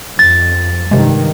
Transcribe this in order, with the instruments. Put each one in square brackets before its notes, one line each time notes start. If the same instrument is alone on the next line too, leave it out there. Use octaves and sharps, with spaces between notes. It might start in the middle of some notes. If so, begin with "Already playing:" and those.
[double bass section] F2 [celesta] A6
[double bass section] G2 D#3 [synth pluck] C3 G#3